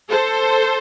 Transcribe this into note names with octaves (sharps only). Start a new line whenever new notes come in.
A4 C5